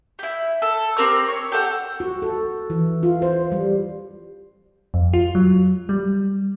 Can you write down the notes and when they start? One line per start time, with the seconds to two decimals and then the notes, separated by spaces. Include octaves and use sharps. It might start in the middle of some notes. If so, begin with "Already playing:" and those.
0.19 E4 G4
0.62 A4
0.97 C4 G4 A#4 E6
1.28 C#5
1.52 G4 A4 F#5
2.00 F#4
2.22 A4
2.70 E3
3.03 F4
3.22 C5
3.52 G3
4.94 F2
5.14 F4
5.35 F#3
5.89 G3